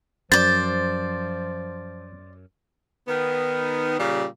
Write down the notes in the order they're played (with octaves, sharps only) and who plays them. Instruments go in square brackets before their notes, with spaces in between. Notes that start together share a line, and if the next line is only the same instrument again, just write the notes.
[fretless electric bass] F#2 [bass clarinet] F3 [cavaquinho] C5 D5 [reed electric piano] A6
[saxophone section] D#3 B3
A#2 C#3 G3